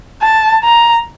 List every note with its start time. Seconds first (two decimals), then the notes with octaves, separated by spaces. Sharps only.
0.22 A5
0.64 A#5